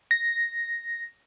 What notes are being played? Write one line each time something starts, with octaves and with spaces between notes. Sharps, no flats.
A#6